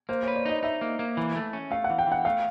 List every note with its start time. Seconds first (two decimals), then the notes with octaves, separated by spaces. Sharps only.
0.09 A#3 C5
0.23 B4 C#5
0.36 D5
0.45 D#4 D#5
0.63 D#4 E5
0.81 A#3
0.99 A#3
1.17 E3
1.36 A3
1.53 C#4
1.71 A3 F5
1.84 F#5
1.90 E3
1.98 G5
2.07 E3 F#5
2.25 A3 F5